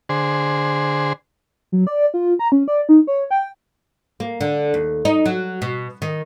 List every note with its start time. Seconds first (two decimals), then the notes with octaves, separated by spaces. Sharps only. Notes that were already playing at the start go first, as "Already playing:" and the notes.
0.09 D3 G#4 C5
1.72 F#3
1.87 D5
2.14 F4
2.39 A#5
2.52 C#4
2.68 D5
2.89 D#4
3.07 C#5
3.31 G5
4.20 A#3
4.41 D3
4.74 D#2
5.05 D#4
5.25 F#3
5.62 B2
6.02 D#3